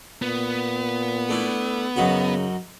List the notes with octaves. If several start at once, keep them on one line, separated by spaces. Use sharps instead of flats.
A#2 B3
A3 D4 E4
F#2 C#3 D#4 F#4